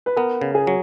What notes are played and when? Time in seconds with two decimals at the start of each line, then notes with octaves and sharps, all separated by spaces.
0.06 B4
0.16 B3 A#4
0.41 C#3
0.55 G#4
0.67 F#3